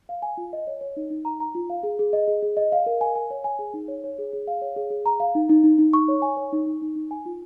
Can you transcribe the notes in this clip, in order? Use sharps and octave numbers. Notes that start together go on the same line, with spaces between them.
F5
G#5
F4
D#5
C#5
C#5
D#4
D#4
A#5
A#5
F4
F5
G#4
G#4
D#5
G#4
G#4
D#5
F5
A#4
G#5
G#5
C#5
G#5
G#4
D#4
C#5
C#5
G#4
G#4
F5
C#5
G#4
G#4
A#5
F5
D#4
D#4
D#4
D#4
C#6
C#5
G#5
C#5
D#4
D#4
D#4
D#4
G#5
F4